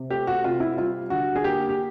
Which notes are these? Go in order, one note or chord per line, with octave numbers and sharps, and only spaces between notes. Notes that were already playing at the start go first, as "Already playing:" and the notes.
Already playing: C3
A3 G4
F#4
C3 F4
E4
G3 F4
D3 F#4
G#4
A#3 G4
G4